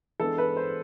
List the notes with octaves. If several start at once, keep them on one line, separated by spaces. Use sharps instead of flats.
E3 G#3 B3 D4 A4
B4
C5